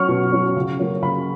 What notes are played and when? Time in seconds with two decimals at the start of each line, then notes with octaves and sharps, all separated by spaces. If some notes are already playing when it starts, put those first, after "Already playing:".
Already playing: F#3 C#4 C#6 F6
0.08 B2
0.32 F#3 C#4
0.56 C#3
0.79 F#3 A#3 C#4
1.02 C#3 B5